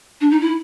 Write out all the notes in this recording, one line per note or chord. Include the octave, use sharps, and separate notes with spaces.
D4
D#4
E4